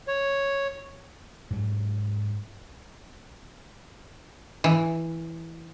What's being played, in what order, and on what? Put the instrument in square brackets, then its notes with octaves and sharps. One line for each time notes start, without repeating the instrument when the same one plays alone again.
[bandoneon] C#5
[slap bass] G#2 F#3
[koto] E3